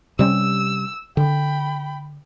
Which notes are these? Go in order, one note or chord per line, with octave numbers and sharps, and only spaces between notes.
C3 G3 C#4 E6
D3 G5 B5